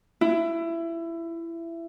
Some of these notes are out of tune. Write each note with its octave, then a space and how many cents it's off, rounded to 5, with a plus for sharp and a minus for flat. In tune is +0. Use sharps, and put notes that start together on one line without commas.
E4 +20